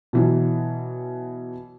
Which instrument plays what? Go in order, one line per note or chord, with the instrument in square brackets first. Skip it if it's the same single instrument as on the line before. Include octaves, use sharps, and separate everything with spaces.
[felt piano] B2 E3 F#3